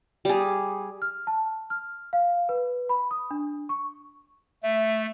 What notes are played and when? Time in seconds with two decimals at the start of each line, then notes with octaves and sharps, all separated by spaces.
0.25 G3 G#4
1.02 F6
1.27 A5
1.70 F6
2.13 F5
2.49 B4
2.89 B5
3.11 D#6
3.31 D4
3.69 C#6
4.63 A3 E5